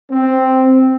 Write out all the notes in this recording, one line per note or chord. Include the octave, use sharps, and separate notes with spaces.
C4